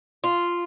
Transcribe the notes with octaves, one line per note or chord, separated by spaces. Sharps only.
F4